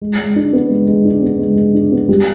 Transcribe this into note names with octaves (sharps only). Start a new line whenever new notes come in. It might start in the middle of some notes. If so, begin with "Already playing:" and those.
G#3
G#3
D4
B3
G#3
G#3
D4
B3
G#3
G#3
D4
B3
G3